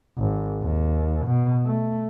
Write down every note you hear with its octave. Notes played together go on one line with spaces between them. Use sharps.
G#1
D#2
B2
A3